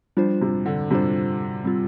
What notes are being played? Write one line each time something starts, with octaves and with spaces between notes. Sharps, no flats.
F3 G3 D4 F4 C5
C3
D3
C3 G3 D4 F4 C5
G3 C4 F4